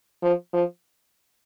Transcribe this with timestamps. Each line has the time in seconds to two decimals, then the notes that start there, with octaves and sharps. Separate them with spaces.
0.23 F3
0.53 F3